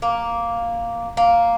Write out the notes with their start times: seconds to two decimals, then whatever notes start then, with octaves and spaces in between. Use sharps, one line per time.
0.02 A#3
1.17 A#3